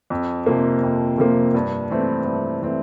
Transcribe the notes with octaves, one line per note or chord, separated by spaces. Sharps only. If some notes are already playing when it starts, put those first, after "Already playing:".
F2
C3 F3 A#3
F2
C3 F3 A#3
G2
E3 A3 C4 E4
G2
E3 A3 C4 E4